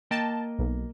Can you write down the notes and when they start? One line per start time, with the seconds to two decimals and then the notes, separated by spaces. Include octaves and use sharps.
0.11 A#3 D#5 G5 A5
0.59 B1